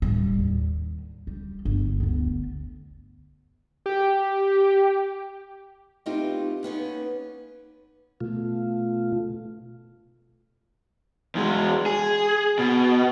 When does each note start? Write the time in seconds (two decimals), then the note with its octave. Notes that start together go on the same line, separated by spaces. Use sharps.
0.02 A2 G3
0.39 D#2
1.27 G3
1.65 G1
2.00 D2 B3
3.86 G4
6.06 A3 B3 C4 D#4 F4 G4
6.63 A#3 B3 C#4 D#4
8.21 B2 A3 F4
11.35 E2 G#3
11.86 G#4
12.59 B2